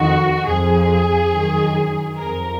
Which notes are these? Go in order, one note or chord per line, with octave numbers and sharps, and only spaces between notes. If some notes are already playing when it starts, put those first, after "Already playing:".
Already playing: F2 D#3 F#4
F2 G#4
F3
F#2 D#3
F2 F3 A#4